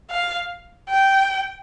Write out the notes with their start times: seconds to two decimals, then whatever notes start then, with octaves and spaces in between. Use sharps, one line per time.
0.11 F5
0.89 G5